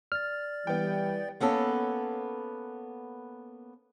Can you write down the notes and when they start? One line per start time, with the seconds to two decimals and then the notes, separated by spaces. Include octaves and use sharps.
0.12 D5 F6 A6
0.67 E3 G3 B3 G5
1.40 A#3 B3 C#4 A4